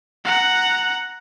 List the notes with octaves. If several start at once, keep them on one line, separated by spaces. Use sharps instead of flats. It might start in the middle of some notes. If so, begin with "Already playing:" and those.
F#5 A#5